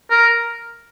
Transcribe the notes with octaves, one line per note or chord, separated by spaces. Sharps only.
A#4